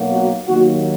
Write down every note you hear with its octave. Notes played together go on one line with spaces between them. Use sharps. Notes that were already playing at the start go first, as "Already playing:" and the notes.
Already playing: B1 B2 F#3 A#3
F#4
D#2 D#3 F#3 A#3 F#4